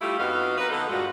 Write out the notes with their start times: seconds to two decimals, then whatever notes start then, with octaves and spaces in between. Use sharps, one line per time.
0.02 G3 A3 E4 F4 G4
0.18 F2 B3 D#4 F#4 F5
0.58 F#4 A#4 B4
0.70 D3 B3 D#4 A4
0.89 G2 A#2 G#3 F4 F#4